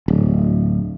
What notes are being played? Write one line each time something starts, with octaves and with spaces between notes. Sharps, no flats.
D1